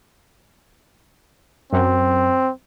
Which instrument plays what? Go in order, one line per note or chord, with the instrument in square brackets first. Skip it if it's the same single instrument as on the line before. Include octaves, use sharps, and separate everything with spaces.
[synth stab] F#2 [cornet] C4